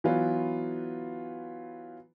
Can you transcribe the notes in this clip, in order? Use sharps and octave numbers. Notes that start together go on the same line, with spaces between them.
E3 F#3 B3 F4